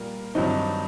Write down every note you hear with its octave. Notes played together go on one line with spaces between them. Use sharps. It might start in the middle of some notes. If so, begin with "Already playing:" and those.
Already playing: A#2 G3 A#3
G2 D#3 F#3 C4 D#4